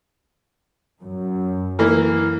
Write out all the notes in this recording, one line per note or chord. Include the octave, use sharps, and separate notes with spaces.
F#2
E3 A#3